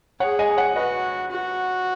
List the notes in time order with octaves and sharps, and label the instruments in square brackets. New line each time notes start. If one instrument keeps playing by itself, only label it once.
[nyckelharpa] G#4 [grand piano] C#5 F#5
[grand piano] D#5 G#5
G#5
C#5 F#5
[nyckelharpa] F#4 [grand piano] B4 D#5
[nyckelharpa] F#4